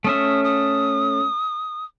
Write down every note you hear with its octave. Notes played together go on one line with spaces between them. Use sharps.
A3 C#4 E5 D#6
D#6